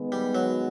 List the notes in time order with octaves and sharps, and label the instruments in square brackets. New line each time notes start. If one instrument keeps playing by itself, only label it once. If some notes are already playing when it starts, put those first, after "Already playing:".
Already playing: [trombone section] D#3 G#3 B3
[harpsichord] G3
F#3